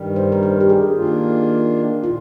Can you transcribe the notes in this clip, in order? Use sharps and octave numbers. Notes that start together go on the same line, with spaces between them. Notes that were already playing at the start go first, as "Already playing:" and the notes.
Already playing: G2 D#3 G3
C5
A#4
C5
G4
G#4
D#3 A#3 D4 F4
A#2 F4